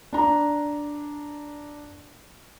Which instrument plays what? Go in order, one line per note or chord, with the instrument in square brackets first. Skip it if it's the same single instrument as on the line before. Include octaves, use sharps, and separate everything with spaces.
[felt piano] D4 A#5